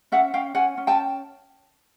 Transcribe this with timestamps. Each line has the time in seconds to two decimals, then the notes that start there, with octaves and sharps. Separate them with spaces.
0.12 C#4 E5 F#5
0.34 C#4 F5 G5
0.55 C#4 F#5 G#5
0.77 C#4
0.87 G5 A5